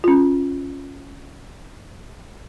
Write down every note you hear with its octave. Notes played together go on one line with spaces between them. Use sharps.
C#4 F4